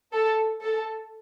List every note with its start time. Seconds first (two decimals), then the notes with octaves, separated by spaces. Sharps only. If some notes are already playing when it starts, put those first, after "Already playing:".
0.13 A4
0.62 A4